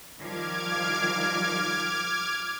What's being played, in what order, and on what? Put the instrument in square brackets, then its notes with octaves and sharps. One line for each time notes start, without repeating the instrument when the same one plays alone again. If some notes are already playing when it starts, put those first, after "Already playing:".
[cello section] D#3 F3 G3 [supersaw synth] D6 F6 G#6